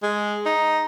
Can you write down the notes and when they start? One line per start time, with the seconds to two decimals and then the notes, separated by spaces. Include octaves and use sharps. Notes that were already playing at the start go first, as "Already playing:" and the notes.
0.03 G#3
0.46 D#4